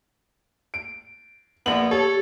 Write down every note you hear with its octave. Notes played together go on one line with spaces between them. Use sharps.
D7
A#1 B3 F#7
G4 A4 C#5